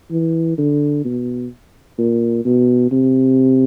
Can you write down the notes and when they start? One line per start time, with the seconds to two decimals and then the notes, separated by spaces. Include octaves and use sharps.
0.11 E3
0.58 D3
1.05 B2
1.98 A#2
2.45 B2
2.91 C3